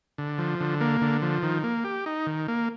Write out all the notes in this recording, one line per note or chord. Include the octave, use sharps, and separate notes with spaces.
D3
F3
D3
A#3
D3
F3
D#3
A#3
G4
D#4
D#3
A#3